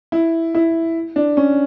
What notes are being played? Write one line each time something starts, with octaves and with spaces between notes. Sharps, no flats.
E4
E4
D4
C#4